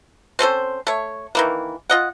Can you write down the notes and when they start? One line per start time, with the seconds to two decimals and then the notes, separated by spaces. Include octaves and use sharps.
0.39 C4 C#4 A4 C5
0.87 A3 C#5
1.35 D#3 E3 A#3
1.90 F4 D#5 F#5